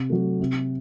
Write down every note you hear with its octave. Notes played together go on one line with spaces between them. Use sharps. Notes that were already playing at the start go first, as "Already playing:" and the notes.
Already playing: C3
F#3 A3
C3